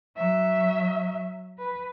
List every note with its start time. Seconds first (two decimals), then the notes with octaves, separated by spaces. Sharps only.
0.17 F#3 E5
1.58 B4